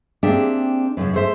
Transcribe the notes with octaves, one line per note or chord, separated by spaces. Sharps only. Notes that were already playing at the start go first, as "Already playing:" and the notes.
A#3 C4 D4 G4 G#4 E5
F#2 A2 C#3
A3 G#4 C5 E5